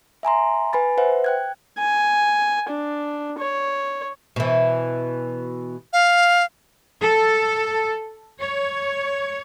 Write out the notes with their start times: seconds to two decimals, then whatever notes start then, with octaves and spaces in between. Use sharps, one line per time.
0.23 E5 G#5 A#5 C6
0.73 B4 G#5 B5 A6
0.98 B4 C5 E5 F#5
1.24 G5 F#6 G#6
1.78 G#5
2.69 D4
3.38 C#5
4.36 B2 E3
5.93 F5
7.02 A4
8.41 C#5